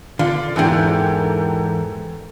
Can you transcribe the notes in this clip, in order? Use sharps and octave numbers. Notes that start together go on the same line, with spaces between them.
D3 F4
E2 G#2 D3 E3 G4 A4 A#4